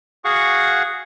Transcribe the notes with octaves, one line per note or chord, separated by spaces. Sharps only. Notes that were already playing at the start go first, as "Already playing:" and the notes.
F#4 G#4 F5 F#5 C#6